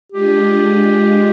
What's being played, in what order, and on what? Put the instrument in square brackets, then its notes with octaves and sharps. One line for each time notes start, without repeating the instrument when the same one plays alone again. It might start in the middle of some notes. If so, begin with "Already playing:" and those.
[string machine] G#3 D4 F4 G#4 D#5 [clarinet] G4